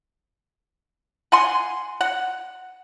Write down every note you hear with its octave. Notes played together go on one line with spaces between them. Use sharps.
F#5 G#5 C6
F#5